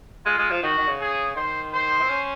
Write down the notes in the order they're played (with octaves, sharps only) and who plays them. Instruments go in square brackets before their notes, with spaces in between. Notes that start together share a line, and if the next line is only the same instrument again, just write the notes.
[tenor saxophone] G#3 [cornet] F4
[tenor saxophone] G#3
F3
[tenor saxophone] D#3 [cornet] F#4
[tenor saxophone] D#3
C#3
[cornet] G#4
[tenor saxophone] D#3 [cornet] C5
[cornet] C5
[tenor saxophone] C4
C#4